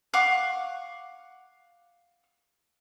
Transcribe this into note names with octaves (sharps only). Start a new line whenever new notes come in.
F5 F#5 C#6 D6